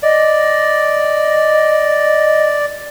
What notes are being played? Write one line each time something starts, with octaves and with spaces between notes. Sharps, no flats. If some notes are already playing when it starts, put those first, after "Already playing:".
D5 D#5